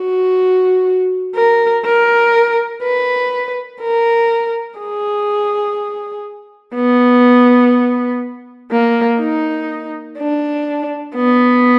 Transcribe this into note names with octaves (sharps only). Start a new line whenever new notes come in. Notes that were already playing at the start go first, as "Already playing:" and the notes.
Already playing: F#4
A#4
A#4
B4
A#4
G#4
B3
A#3
D#4
D4
B3